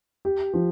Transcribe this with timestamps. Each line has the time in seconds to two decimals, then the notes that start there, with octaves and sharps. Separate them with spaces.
0.25 G4
0.53 F3